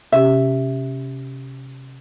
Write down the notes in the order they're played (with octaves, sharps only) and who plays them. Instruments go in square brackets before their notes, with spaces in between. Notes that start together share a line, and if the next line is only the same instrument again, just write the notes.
[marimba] C3 C#4 G4 [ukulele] E5